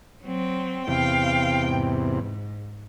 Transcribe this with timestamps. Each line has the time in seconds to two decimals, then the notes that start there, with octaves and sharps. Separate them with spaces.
0.23 F#3 C4
0.88 E2 C3 F5 G5
1.70 G#2